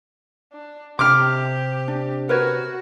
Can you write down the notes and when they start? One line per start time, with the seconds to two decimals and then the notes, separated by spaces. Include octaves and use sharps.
0.53 D4
0.99 C3 G4 D6 F6
1.88 D4
2.29 F#4 A#4 B4 C#5